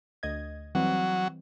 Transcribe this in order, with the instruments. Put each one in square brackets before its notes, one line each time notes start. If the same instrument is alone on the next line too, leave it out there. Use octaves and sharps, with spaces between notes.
[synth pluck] D2 D#5 G#6
[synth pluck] E3 G3 C4 [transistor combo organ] F#3